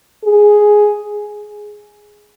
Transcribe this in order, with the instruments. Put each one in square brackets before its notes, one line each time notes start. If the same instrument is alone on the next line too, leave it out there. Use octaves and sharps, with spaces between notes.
[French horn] G#4